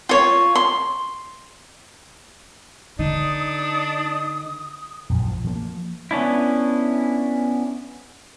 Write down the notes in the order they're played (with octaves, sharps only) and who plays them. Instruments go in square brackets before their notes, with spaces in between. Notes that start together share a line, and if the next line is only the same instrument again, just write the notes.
[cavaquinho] F4 C#5
C6
[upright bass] D3 [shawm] D4 [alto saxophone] D#4 [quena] D#6
[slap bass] A#1 F#2 A#2 F3
F3 G3 A#3
[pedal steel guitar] B3 C#4 D4 E4